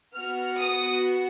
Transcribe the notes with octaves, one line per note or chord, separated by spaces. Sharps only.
B3 F#4 F6
D#6